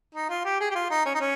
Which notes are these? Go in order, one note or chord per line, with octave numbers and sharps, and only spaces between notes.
D#4
F4
G4
G#4
G4
F4
D#4
C#4
D#4
C#4